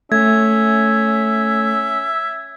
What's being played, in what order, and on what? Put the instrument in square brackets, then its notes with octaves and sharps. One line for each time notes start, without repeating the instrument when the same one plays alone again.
[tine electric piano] A3 [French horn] C#4 [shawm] E5 [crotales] G#6